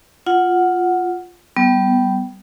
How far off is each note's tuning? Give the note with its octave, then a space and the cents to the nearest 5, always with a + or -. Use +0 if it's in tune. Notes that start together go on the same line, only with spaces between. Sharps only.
F4 +0 F#5 +0
G3 -20 B3 +0